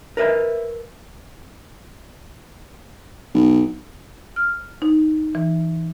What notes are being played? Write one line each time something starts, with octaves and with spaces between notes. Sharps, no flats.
A#4 B4 D#5 E5
B1
F6
D#4
E3